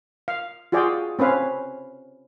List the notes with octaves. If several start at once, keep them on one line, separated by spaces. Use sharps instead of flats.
F5
F4 F#4 G#4 D5 F5 G5
C4 C#4 B4 F5